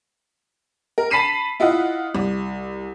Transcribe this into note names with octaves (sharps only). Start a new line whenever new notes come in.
A#4
A5 B5 B6 C7 D#7 E7
E4 F4 D#5 F#5
C2